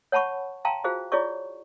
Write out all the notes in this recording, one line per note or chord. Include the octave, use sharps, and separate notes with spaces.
C#5 F#5 A5 B5 C#6
F5 G5 A5 A#5 C6
F4 F#4 G#4 C5 F5
E4 F4 G#4 C#5 D5 C#6